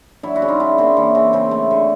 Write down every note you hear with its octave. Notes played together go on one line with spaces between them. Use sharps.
F#3 D4 E4
E4 F#4
C#3
D#4 F4
C#3 D4 E4
A#3 C4 D4
E3 C#4
C#3 C4
C#3 C4
A3
D3